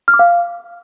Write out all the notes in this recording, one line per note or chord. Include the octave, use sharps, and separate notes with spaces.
F6
D6
F5